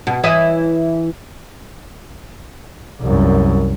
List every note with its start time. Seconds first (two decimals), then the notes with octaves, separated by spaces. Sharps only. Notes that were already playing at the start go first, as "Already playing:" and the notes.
0.07 B2
0.24 E3 E4 D#5
3.01 C2 F#2